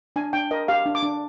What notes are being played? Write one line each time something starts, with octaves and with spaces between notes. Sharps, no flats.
D4 G#5
D4 G5
A#4 D#5
G4 F5
D4
D6
D4